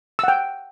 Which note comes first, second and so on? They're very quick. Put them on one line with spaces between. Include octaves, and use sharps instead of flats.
E6 F#5 G5